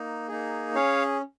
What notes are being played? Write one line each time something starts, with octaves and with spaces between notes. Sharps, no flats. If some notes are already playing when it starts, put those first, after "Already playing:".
Already playing: A#3 D#4
A#3 D#4 G#4
C#4 G#4 C#5 F5